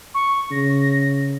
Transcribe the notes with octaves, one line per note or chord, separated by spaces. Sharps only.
C#6
C#3 A#6